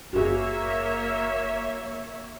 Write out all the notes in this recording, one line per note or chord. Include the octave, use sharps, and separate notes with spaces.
F#1 A#3 F#4 G#4 C#5 E5